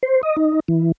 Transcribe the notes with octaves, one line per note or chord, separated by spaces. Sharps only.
C5
D#5
D#4
E3